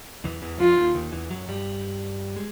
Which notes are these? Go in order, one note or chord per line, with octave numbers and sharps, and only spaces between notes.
E2 E3
E2 E3
F2 F3 F4
D#2 D#3
D#2 D#3
E2 E3
F#2 F#3
G2 G3
G#3